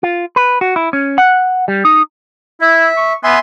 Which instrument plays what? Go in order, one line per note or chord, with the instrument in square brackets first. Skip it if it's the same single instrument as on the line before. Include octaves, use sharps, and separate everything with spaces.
[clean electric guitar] F4
B4
F#4
E4
C#4
F#5
G3
D#4
[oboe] E4 [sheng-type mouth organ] E5
[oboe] C#6
[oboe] B3 [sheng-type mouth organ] E5 G#5 C6